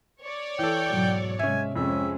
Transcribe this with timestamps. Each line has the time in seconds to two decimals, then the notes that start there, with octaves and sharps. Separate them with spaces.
0.22 C#5 D5
0.59 E3 A4 G5
0.89 G#2 B2 F#3
1.39 C3 F#3 G#3 C#4 E5 G#5
1.76 F2 G#3 C4 C#4 E5